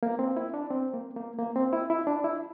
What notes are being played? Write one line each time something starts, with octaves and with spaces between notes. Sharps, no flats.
A#3
C4
E4
D4
C4
A#3
A#3
A#3
C4
E4
E4
D4
E4